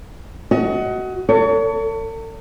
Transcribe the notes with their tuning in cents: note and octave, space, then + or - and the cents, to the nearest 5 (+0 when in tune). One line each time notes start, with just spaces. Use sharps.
F#4 +15 D#5 +30
A4 +40 C#5 +35